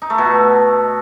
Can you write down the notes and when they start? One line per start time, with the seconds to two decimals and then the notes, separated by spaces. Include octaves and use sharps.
0.02 D#4
0.10 A3
0.18 B2